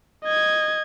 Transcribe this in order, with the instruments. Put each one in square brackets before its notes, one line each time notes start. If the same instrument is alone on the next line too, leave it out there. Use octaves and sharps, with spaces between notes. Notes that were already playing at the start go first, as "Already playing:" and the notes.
[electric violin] D#5 G#6